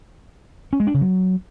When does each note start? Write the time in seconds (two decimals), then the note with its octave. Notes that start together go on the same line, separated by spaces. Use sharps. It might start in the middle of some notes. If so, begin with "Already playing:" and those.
0.73 C#4
0.80 G#3
0.87 D4
0.94 C#3
1.01 F#3